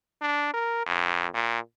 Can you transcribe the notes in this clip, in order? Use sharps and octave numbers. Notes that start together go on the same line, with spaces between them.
D4
A#4
F2
A#2